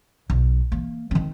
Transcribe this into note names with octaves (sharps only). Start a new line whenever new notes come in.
B1
E3 A#3
D#3 C4